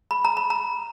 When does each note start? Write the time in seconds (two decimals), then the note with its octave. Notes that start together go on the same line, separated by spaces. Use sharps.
0.11 B5
0.25 A#5
0.37 B5
0.50 A#5